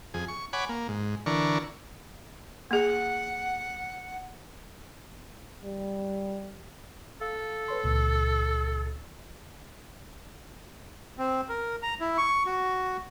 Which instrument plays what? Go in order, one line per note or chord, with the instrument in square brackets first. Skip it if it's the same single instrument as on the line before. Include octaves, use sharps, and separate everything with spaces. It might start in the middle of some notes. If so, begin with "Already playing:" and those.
[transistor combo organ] F2 G#4
C#6
C#5 F#5 G#5 B5 D6
A#3
G#2
D3 E3 D4 A#4 C#6
[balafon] A#3 G#4 [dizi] F#5
[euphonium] G3
[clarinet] A4 [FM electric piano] F5
[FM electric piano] B4 C#5 C6
C#2 A#2
[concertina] C4
A#4
A#5
E4
C#6
F#4